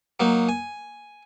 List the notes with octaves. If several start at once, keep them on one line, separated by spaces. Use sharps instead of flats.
F#3 A#3 D#4
G#5